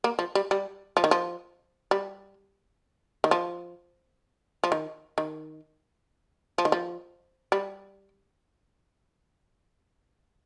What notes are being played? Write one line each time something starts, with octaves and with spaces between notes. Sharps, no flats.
A#3
F3
G3
G3
F3
D#3
F3
G3
D#3
F3
F3
D#3
D#3
F3
D#3
F3
G3